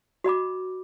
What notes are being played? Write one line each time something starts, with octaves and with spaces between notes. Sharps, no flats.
F#4 D#5 B5 D6